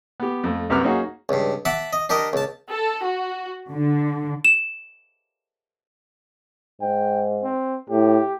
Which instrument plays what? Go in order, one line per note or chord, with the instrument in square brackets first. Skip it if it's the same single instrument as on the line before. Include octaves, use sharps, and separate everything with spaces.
[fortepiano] B3 G4
F2 A3
C2 F#2 C3 B4 D6 F6
A#3 C#4 D#4 F#4 G#4
[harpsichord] C#2 G2
E5 F#5 A5 D6
D#5
D4 G4 A#4 D#5
C#2 A5
[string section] A4
F#4
D3
[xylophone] E7
[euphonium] G#2 [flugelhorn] G5
[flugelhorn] C4
[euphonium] A2 [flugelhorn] G4